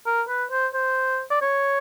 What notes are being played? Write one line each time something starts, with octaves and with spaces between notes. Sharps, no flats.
A#4
B4
C5
C5
D5
C#5